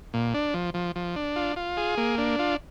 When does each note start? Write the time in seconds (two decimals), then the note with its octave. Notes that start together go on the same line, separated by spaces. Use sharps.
0.14 A#2
0.34 D4
0.54 F3
0.74 F3
0.96 F3
1.16 D4
1.36 F4
1.56 F4
1.77 G#4
1.98 A#3
2.18 D4
2.39 F4